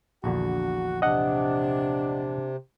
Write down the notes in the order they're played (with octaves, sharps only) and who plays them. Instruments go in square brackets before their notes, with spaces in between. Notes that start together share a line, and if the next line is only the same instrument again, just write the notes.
[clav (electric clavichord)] A#1 E2 D3 [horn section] F#4 F#5
[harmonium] C3 [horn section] D4 [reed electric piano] D#5 F#5